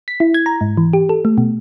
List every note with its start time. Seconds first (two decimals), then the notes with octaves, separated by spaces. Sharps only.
0.08 B6
0.20 E4
0.34 G#6
0.46 A#5
0.61 G#2
0.77 E3
0.93 G4
1.09 A4
1.25 A3
1.38 B2